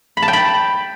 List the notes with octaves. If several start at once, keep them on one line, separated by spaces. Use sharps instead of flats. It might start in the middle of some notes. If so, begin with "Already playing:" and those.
B5
A5
G5
B5